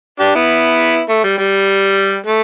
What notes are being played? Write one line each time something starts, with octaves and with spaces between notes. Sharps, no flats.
D4 G4
B3 E4
A3
G3
G3
A3